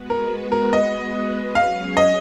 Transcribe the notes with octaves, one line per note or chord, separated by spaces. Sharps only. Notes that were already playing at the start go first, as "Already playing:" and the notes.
Already playing: G#3 B3 F#4 B4
A#4
A#4
D#5
F#3 C#4 G#4 C#5 F5
D#5